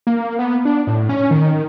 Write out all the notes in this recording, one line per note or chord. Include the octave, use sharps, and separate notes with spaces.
A#3
B3
D4
A2
C#4
D#3